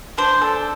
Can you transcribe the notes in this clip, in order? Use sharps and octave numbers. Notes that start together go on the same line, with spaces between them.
D4 C5
A4